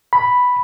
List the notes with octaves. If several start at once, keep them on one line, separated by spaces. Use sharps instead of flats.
B5